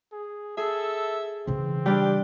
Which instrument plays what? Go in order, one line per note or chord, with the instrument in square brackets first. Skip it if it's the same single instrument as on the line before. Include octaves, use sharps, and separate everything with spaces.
[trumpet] G#4
[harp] G#4 [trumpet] A4 [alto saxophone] E5
[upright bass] C#3 E3 [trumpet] C4
[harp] G3 D4 [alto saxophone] G4